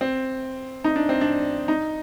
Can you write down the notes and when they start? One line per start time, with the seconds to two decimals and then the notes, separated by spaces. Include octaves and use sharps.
0.01 C4
0.84 D#4
0.96 D4
1.09 C4
1.21 D4
1.68 D#4